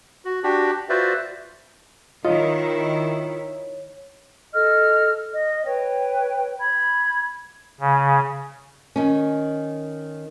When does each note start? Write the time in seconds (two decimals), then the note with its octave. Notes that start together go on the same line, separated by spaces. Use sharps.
0.25 F#4
0.44 D4 F#4 G4
0.89 F4 F#4 B4 C5 D5 E5
2.25 D#3 E4 F4 C#5 D#5
4.54 A4 D#5 F6
5.32 D#5
5.65 B4 C#5 G5
6.60 B5 G#6
7.81 C#3
8.96 D#3 C#4